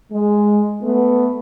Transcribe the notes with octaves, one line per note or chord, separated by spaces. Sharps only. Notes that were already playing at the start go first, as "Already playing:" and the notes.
G#3
A3 B3